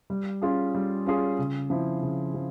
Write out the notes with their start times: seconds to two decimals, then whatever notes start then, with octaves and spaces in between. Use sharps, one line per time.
0.10 G3
0.42 C#4 F4 G#4
0.75 G3
1.06 C#4 F4 G#4
1.39 C#3
1.70 F3 C4 E4
2.02 C#3
2.34 F3